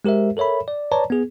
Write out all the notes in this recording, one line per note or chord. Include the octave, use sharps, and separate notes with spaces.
G#3 G4 A#4 C5 E5
A4 A#4 C#5 E5 B5
D5
B4 C#5 D5 A5 A#5
B3 G#4